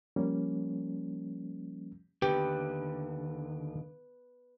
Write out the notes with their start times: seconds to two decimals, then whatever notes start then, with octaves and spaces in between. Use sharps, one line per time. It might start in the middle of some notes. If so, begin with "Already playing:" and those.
0.16 F3 G3 A#3 C#4
2.22 D#2 D3 G4 B4